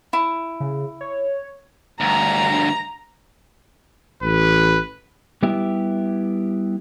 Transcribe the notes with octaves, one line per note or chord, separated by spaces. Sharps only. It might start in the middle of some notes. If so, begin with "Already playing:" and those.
E4
C#3
C#5
D2 G2 A#5
A1 B4
G3 B3 E4 G4 E5